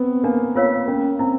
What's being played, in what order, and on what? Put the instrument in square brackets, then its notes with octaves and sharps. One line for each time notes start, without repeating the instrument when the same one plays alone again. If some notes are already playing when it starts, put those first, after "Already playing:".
Already playing: [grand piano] B3 C4
[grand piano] A#3 [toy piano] D4
[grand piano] A#3 [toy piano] F4 A#4 C#5 F5
[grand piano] A#3 [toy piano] C#4
[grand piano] C4 [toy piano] E4